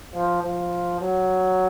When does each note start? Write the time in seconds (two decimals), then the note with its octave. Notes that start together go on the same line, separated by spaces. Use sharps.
0.14 F3
0.43 F3
1.01 F#3